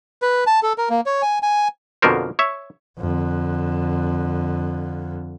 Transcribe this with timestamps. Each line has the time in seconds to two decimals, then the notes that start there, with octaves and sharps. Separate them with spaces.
0.22 B4
0.47 A5
0.63 A4
0.78 A#4
0.90 A#3
1.06 C#5
1.22 G#5
1.43 G#5
2.02 F2 B2 D3 F4 A#4 C5
2.39 C#5 E5
2.98 F2 D3